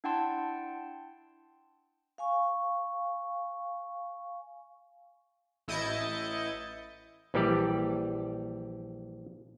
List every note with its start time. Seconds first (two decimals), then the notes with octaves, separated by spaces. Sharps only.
0.04 D4 E4 F#5 G5 A5 C6
2.18 F5 G#5 C#6
5.68 A1 E4 D#5 G6 A6 C#7
7.34 A#1 E3 G3 G4 D5